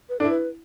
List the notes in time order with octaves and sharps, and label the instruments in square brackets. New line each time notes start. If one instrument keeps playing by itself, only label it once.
[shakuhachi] B4
[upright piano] D4 [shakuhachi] A4
[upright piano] E4
[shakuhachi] B4